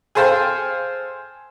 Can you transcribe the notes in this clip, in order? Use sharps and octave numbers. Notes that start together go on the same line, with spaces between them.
G#4 A4 C5 F5 G5